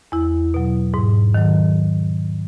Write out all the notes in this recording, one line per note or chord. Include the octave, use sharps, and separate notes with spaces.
E2 E4
B2 F#3
G#2
D#3 F#3